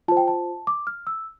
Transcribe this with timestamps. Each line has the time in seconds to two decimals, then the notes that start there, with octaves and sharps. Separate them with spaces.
0.08 F4 C5 A5
0.17 G5
0.28 A5
0.67 D6
0.87 F6
1.07 E6